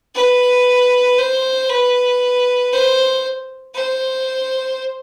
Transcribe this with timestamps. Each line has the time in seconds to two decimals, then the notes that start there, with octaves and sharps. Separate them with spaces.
0.15 B4
1.18 C5
1.70 B4
2.72 C5
3.75 C5